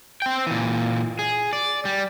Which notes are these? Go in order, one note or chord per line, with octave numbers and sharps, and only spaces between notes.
C4 G5
A#2 E3
G#4
D5
G3